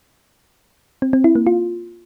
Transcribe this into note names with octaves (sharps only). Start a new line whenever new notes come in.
C4
C4
E4
A#3
F4